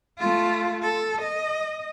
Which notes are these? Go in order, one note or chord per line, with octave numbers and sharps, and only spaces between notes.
A3 F4
A4
D#5